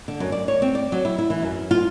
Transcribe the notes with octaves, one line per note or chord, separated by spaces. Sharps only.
D3
F#2
D5
C#5
C4
D5
F#3
E4
E4
E3
F#2
F4